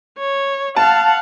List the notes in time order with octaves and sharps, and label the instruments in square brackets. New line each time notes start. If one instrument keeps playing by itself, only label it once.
[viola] C#5
[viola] F5 F#5 [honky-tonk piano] A5